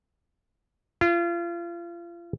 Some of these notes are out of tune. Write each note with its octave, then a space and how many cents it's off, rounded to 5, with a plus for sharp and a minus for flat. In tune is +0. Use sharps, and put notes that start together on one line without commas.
F4 -35